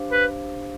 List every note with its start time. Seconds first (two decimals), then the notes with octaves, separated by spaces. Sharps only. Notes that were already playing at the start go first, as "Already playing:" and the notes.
Already playing: D4 G4 C5 F5
0.12 B4